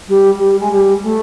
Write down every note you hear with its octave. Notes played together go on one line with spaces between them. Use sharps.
G3
G3
G#3
G3
A3